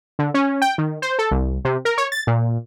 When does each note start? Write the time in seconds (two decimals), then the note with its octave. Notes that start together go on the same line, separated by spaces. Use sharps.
0.19 D3
0.34 C#4
0.62 G5
0.78 D#3
1.02 C5
1.19 A4
1.31 C2
1.65 C3
1.85 A#4
1.98 C#5
2.12 A6
2.27 A#2